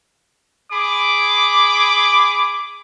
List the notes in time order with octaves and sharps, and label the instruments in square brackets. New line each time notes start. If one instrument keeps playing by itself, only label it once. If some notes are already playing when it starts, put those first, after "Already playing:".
[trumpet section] G#4 B5 D6